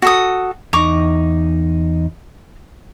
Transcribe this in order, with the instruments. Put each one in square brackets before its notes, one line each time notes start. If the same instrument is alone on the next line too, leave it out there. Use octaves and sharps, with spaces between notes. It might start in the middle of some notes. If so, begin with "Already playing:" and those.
[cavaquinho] F#4 A4 D#6
[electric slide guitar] E2 D#4 [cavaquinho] A#5 C#6 D6